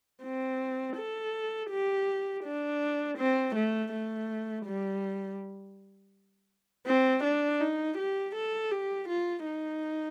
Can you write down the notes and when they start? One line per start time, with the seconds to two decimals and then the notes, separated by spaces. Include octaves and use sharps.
0.24 C4
0.96 A4
1.71 G4
2.45 D4
3.18 C4
3.55 A3
3.92 A3
4.66 G3
6.87 C4
7.24 D4
7.61 D#4
7.98 G4
8.35 A4
8.71 G4
9.09 F4
9.45 D#4